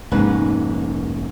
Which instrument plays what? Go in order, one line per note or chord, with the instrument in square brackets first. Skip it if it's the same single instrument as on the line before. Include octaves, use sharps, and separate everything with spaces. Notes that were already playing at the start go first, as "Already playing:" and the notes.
[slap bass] F1 A#3 C#4 [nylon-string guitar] G#2 B4